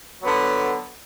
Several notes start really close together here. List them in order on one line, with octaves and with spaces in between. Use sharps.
F#3 B3 D3